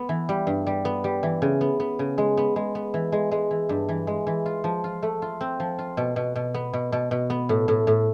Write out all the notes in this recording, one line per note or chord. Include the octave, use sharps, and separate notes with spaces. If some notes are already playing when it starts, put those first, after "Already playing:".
Already playing: B3
E3
G3
G2
G3
B3
G3
E3
C#3
B3
B3
C#3
G#3
B3
G#3
B3
E3
G#3
G#3
E3
G2
E3
G#3
E3
F4
F3
F4
A3
F4
C4
F3
F4
B2
B2
B2
B3
B2
B2
B2
B3
A2
A2
A2